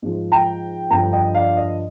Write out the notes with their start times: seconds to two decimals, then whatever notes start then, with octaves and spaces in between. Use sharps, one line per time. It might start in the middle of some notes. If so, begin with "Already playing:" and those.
0.02 G#2 F3
0.32 G5 A#5
0.90 G2 D3 F3 G5 A#5
1.13 D#5 G5
1.35 D5 F5
1.57 D#5